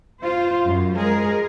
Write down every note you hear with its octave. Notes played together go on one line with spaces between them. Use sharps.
F4 C5
F#2
G#3 G#4 A#4